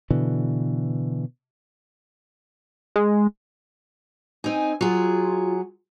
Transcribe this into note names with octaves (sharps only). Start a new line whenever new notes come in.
B2 D3 E3
G#3
C4 D#4 G#5
F#3 F4 G#4